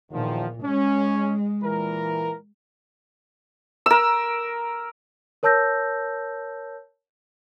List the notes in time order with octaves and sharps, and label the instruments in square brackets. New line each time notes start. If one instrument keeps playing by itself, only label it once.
[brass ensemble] E2 D#3 F3 [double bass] A#2
[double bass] G#3 [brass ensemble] C#4
[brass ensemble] A#2 E3 A#4
[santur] A#4 E6
[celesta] A#4 C#5 A5 E6 G6 A#6